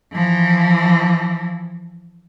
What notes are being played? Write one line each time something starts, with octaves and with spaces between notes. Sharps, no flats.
E3 F3